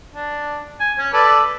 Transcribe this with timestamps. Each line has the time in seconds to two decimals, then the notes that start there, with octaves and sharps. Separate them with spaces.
0.15 D4
0.80 G#5
0.99 C#4
1.13 A4 B4 D5